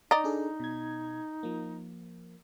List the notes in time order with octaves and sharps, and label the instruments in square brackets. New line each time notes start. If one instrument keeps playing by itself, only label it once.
[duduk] D#4 [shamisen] D5 D#5 A#5
[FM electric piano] D4 G#4 A4
B2 G#6
F3 A#3